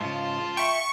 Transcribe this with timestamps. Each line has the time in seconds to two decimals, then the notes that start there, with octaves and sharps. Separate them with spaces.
0.01 G#2 C#3 F4 A5 C6
0.57 E5 G5 C#6